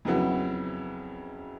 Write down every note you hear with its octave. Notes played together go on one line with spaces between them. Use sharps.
F2 C#3 F#3 B3 E4